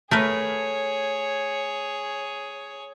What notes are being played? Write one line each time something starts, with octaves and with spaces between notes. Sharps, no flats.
A3 G#4 A#4 B4 C#5